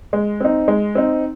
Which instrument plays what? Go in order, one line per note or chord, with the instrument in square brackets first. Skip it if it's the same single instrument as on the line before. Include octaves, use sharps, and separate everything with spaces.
[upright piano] G#3
C4 D#4
G#3
C4 D#4